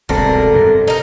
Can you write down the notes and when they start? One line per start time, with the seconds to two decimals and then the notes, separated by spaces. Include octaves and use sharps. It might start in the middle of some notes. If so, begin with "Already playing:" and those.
0.09 E1 C2 D3 C4 A#4
0.53 G2 C3
0.88 D#4 A#4